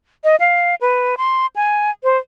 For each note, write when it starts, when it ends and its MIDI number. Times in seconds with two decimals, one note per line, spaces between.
0.24 0.36 75
0.40 0.75 77
0.81 1.15 71
1.17 1.46 84
1.56 1.91 80
2.04 2.17 72